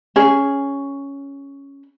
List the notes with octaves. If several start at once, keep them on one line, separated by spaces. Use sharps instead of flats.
C#4 G#4